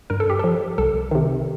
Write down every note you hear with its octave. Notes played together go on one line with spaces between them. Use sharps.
G2 A#4
A4
G4
F3 A4
C2 A4
C3 D#3